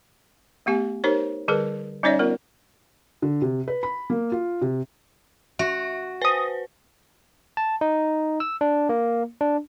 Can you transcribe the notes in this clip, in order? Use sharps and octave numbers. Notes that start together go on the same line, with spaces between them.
A3 B3 G4 G#5
D#4 G4 A#4 C5 C#5
D3 G3 G#4 A#4 B4
G3 C#4 D#4 C#5 D5 E5
B3 F4 A#4
D3
C3
B4
B5
A#3
F4
C3
F#4 E5
B4 C5 D#6 A#6
A5
D#4
E6
D4
A#3
D4